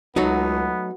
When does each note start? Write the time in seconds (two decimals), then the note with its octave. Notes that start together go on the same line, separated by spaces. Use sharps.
0.16 C#2 F#3 A3 B3 D#4 F#4